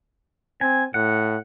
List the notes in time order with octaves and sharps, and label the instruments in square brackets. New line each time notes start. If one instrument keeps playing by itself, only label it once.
[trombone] C4 [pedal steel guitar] G#5
[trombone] A2 [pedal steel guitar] F#5